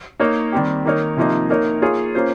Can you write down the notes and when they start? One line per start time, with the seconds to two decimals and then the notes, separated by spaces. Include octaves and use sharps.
0.20 A#3 D#4 A#4 C#5
0.52 D#3 G3 C4 G4
0.85 D#3 A#3 D#4 A#4 C#5
1.17 C3 F3 A#3 D#4
1.50 A#3 D#4 A#4 C#5
1.82 A#3 F4 G#4 C#5
2.15 A#3 C#4 F4 C5